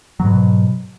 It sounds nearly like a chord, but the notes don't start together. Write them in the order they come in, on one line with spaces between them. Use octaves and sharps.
F#3 G#2 B2